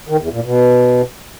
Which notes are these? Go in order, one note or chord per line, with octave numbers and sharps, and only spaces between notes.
D#3
E2
A#2
B2